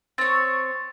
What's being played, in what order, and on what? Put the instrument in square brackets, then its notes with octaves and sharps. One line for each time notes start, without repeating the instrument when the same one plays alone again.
[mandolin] C4 C#5 [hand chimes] A6